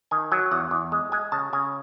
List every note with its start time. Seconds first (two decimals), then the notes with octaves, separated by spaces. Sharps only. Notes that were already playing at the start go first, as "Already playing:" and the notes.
0.11 D#3 G#5
0.32 F#3 G#5
0.51 E2 F#5
0.71 E2
0.92 G#3
1.12 G#3 G#5
1.32 C#3 A5
1.53 C#3 G#5